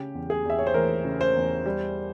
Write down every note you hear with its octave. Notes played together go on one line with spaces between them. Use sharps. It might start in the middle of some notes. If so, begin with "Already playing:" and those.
Already playing: C#3 G4
E2
G#4
E2 E5
C#5
C5
E3 A#4
C#3
C5
E2
G3